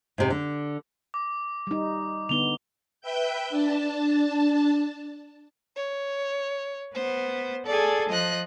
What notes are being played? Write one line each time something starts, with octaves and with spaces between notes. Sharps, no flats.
G#2 C3
D3
D6
G3 D#4
D3 B3 D#4 F7 G7
B4 E5 G5 G6
D4 A5
C#5
B3 C5
G#4 A4 D5 G#5
F3 D#5 F#6